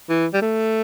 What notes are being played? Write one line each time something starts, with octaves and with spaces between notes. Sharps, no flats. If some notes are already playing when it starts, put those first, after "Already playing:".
E3
G3
A3